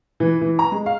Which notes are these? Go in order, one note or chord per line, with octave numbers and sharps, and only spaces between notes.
E3
E3
A#5
G#3
F5